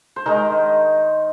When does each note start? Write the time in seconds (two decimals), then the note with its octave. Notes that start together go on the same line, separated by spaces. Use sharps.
0.16 C5
0.26 D#3 G#3 A#4